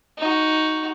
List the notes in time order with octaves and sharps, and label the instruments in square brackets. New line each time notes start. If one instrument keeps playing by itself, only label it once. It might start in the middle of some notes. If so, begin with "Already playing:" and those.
[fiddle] D#4 F#4